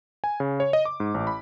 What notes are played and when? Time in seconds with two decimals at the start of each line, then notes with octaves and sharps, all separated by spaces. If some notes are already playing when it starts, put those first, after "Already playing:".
0.24 G#5
0.40 C#3
0.60 C#5
0.73 D#5
0.85 D6
1.00 G#2
1.14 A1
1.27 B5